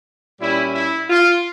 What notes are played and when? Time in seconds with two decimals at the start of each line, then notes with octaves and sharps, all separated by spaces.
0.40 A#2 G3 C#4 E4
0.74 E4
1.09 F4